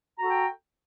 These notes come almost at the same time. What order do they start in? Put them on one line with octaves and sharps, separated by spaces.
A#5 F#4 A4 G5